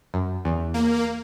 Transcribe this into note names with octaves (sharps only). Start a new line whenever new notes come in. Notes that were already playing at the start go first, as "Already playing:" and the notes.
F#2
E2
A#3